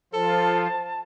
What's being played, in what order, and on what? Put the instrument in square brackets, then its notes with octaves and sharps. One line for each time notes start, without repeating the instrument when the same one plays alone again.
[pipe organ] F3 F4 [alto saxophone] A4 [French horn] C5 [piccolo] A5